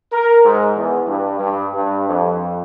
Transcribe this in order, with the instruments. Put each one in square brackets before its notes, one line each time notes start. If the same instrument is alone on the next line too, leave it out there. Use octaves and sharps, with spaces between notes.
[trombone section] A#4
G#2
E2
G2
G2
G2
F2